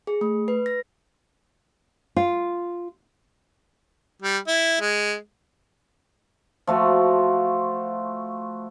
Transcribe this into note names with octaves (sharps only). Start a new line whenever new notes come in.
G#4
A3
B4
A#6
F4
G3
E4
G#3
F3 A3 F#4